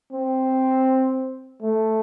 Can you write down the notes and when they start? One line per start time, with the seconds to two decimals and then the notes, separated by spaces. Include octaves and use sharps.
0.12 C4
1.62 A3